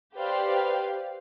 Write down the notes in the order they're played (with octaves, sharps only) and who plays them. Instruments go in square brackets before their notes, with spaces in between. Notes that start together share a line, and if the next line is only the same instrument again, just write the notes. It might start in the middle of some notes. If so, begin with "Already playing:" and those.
[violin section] G4 B4 C5 D5 F5